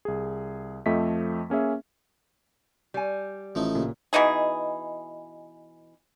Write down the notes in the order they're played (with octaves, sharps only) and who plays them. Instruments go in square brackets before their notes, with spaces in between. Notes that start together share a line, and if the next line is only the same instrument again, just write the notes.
[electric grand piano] C2 G#4
F2 F3 A3 D#5 E5 B6
A#3 C#4 G#4 E5
[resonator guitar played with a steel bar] G3 G#5
[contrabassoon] A1 [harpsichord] F3 A3 D#4
[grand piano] A#2 C#3 G4
[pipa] B2 E3 D#4 G#4